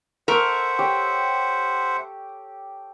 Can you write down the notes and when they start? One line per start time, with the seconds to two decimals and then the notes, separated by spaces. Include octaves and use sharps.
0.28 A4 A#4 C5 E5 F#5 C#6
0.79 G4 C#5 D6